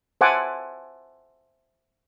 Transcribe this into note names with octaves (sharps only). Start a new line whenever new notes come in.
C5 E5 F#5 G#5 A5 D6